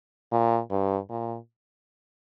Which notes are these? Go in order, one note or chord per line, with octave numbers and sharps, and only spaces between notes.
A#2
G2
A#2